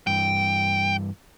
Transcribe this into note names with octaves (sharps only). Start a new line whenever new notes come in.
G2 E3 G5